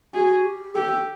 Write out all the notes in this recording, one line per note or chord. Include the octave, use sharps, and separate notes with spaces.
F#4 G#4
G4
G4 A4